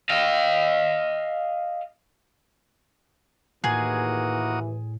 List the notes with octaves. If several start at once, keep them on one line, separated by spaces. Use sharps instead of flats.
D#5 F5
D#2 A2 E3 A#3 F#4 G#4 D#6